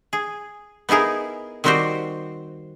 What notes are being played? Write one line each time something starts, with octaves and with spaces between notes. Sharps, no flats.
G#4
B3 D#4 E4 G#4 A#4
D#3 G3 C4 F#4 G4 C5